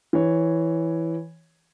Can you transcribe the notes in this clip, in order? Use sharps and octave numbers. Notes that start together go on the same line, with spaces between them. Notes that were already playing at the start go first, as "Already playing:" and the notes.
E3 C#5